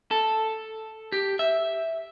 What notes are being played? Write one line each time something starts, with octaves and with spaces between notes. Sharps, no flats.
A4
G4
E5